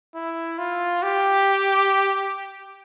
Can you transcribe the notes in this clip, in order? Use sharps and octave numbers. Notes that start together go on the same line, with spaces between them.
E4
F4
G4